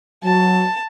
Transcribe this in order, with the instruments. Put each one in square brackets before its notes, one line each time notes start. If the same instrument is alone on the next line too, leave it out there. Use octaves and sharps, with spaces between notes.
[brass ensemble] F#3 [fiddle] A5